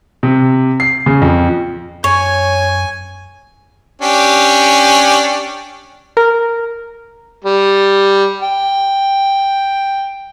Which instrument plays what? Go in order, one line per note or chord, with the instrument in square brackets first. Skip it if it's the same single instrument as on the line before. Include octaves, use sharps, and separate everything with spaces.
[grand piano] C3
C7
C#3
F2
[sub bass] F#2 [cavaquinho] C#5 [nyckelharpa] G#5
[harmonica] C#4 D4 G4
[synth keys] A#4
[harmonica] G3
G5